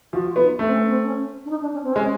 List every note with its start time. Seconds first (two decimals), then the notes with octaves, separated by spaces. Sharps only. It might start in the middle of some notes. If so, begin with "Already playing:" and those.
0.13 F3 F#4
0.29 F4
0.36 B3
0.44 D#4
0.59 A3 C#4
0.66 C4
0.74 C#4
0.89 C4
1.04 C#4
1.46 D4
1.50 D#4
1.62 D4
1.73 C#4
1.84 C4
1.93 G#3 C#4